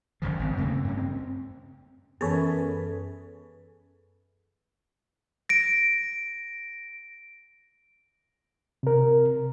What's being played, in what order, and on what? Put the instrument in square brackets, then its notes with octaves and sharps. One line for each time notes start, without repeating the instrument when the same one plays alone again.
[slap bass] F#1 F#2 D#3 F3
G#1 C4
F#2 C#3 A3 A#3
G2 C#4
C4
[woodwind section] F#2 [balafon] E3 B3 [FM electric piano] G#4 A4 B4
[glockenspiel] A#6 D7
[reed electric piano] C3 A#4